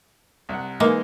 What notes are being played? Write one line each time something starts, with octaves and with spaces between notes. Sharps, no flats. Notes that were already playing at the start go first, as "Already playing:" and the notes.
C2 F#5
E3 G#3 A#3 D#4